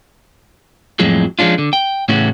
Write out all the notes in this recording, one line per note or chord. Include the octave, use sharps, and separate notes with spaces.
F2 A2 F#3 G#3
F3 G#3 C#4 D4 F4
D3
G5
A2 C#3 E3 C#4 F#4